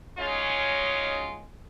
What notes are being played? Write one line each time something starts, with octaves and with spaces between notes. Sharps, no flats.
F#3 G#3 C#4 D#4 F4